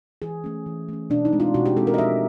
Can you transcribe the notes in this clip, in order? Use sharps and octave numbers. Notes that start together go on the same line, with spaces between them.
E3 G#4
A3 C#4
E3
A3 C#4
B2 D4
D#4
G#3 C4
F4
B2 F#4
G4
G#3 C4 A4
A#4
D#5
F3 E5